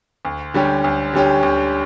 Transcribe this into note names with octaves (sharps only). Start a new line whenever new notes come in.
D2
D3 G3 C#4 G4
D2
D3 G3 C#4 G4
D2